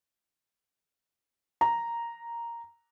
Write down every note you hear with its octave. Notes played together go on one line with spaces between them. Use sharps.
A#5